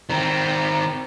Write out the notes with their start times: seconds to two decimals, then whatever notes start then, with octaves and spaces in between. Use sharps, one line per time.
0.10 D#3 C4